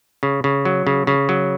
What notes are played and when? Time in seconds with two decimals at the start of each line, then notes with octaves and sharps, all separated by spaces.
0.23 C#3
0.44 C#3
0.65 F#3
0.87 C#3
1.07 C#3
1.29 F#3